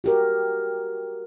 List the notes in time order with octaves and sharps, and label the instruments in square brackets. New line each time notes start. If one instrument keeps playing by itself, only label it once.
[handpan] F#4 G4 A#4